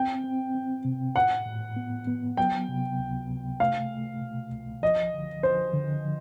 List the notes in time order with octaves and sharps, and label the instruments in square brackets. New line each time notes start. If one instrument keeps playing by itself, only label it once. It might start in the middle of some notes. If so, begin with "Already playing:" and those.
Already playing: [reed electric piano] C4 [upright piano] G5
[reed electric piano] C4
C4
C3
[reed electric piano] A2 [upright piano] F#5
[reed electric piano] A2
B3
B3
[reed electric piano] F#3 [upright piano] G5
[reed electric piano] C3
C#2
C3
[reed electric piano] A3 [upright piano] F5
[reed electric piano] A3
B2
C2
[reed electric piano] F3 [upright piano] D#5
[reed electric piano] D3
[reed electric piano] F3 [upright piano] C5
[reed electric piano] D3
F3